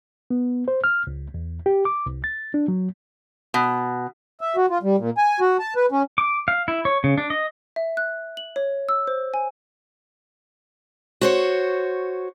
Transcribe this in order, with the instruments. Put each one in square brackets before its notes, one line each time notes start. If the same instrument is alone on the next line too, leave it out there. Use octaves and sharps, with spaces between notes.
[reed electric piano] B3
C5
F6
C#2
E2
G4
D6
C2
A6
D4
F#3
[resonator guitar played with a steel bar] B2
[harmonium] E5
F#4
F4
G3
A#2
G#5
F#4
A5
B4
C#4
[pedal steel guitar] D6
F5
E4
C#5
C#3
D4
D#5
[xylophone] E5
F#6
F#7
C#5
E6
C5
G#5
[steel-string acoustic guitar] F#4 C5 C#5